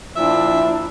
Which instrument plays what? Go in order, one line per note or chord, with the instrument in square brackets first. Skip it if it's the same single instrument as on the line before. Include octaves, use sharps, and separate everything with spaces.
[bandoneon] A#2 [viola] F3 D4 [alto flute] E4 [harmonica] E5